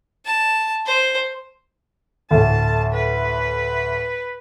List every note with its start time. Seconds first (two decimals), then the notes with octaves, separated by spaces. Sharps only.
0.25 A5
0.85 C5
2.31 D2 A2 A5
2.93 B4